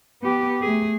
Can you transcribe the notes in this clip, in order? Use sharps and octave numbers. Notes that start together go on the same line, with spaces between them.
B3 G4
A3 G#4